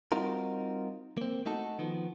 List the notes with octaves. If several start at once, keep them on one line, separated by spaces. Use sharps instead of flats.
G3 C4 D#4 F4 F#4 A#4
A#3 C4
A3 D#4 F#4 A4
D#3 F3 B3